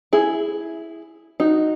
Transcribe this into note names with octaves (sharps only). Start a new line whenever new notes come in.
E4 G#4
D#4 F#4